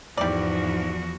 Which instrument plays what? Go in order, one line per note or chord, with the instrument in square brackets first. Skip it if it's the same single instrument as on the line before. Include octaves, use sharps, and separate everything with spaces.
[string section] E2 [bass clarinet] G#2 [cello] F3 F#4 [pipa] G3 D5